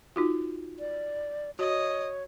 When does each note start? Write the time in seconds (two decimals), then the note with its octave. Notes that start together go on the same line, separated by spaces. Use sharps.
0.16 D#4 F4 F#4
0.79 D5
1.59 F#4 C#5 D#5